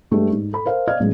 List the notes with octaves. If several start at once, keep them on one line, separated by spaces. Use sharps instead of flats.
G2 G#3 A3 G4
G#2
A4 B5
A#4 C5 F5
D5 D#5 F5 F6 G#6
A1 F#3 G#3